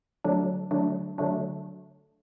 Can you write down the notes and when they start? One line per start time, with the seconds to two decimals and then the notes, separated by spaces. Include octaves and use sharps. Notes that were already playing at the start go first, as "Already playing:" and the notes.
0.24 D3 F#3 A3 D4
0.71 D3 F#3 A3 D4
1.18 D3 F#3 A3 D4